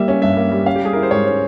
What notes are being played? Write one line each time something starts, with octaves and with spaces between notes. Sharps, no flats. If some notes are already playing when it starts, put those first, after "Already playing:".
Already playing: G3 A#3 E5
C#4
G2 E5
A#3
G3
C#4 F5
G4
G3 G#4
E4 A#4
C5
G#2 C#5
C#4